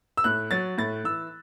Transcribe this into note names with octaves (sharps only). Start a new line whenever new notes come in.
E6
A2 F#6
F#3 A6
A2 A6
E3 E6